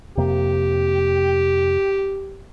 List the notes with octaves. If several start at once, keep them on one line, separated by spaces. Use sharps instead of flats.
F2 C3 A#3 G4